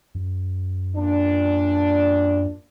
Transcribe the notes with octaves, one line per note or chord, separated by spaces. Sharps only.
F#2
A#2 D4